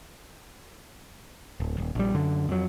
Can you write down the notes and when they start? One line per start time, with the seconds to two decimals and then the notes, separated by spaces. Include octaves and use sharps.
1.60 D1
1.78 D#1
1.95 A#1 G3
2.14 F#2 D3
2.48 F2 F#3